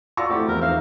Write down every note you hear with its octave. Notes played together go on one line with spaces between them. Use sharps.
F4 F#4 D5 C#6 E6 A#6
A3 C4 E4 F#4 G4
E2 F3 A#4
D#4 C5 E5 F5